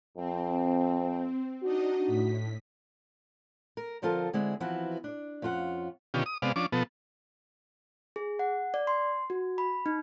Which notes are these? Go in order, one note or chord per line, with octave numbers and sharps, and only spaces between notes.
F2 C4
D4 D#4 F#4 D#5
A2 B6
A#4
D3 F3 C4 F4 A4 A#4
D3 G#3 C4 E4 G#4
E3 F3 B3 C4 E4 F#4
D4 D5
F2 C#4 F4 A4 F#5
B2 D3 D#3 C#4 F4 G4
D#6
C3 G#3 B3 D5 F5
F3 C#4 D4 D6
B2 F3 B3 A4
G#4
F#5
D5
C6
F#4
B5
D#4